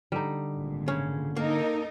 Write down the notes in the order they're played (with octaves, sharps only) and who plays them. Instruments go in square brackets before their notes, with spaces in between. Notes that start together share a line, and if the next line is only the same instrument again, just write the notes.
[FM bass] D3 [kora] G3 D#4
[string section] G#1 A#2
[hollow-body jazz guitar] C#3 [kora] C#4
[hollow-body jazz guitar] A#3 [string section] D#4 A4 A#4